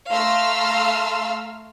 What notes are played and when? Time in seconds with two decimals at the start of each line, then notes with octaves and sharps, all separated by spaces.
0.11 A3 F5 A#5 C6 E6 F6